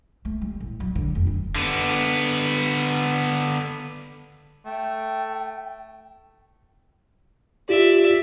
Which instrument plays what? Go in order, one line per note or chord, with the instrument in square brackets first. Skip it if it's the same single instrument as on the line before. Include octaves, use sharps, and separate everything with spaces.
[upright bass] A3
G3
A1
F#3
D3
F1
D4
[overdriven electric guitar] D3 B3
[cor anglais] A3 [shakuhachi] G5
[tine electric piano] F4 G4 [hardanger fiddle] D5 E5